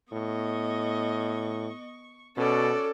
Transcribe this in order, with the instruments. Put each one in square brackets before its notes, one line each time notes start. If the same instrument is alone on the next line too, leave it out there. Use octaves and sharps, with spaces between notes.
[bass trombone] A2 [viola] B3 D#5 [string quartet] C#6
[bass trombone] B2 [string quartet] C#4 F#4 D5 [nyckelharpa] A4